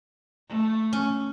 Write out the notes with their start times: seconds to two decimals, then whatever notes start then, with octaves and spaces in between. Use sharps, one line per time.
0.49 A3
0.93 C#4